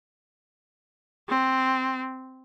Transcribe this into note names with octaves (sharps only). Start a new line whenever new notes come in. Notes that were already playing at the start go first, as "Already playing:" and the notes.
C4